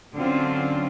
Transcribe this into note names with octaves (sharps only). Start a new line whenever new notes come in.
D3 F#3 C4 C#4 F4